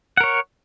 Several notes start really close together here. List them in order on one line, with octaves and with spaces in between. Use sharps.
F#5 A#4 C#5